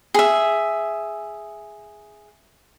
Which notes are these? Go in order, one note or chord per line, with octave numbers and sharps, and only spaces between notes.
G#4 E5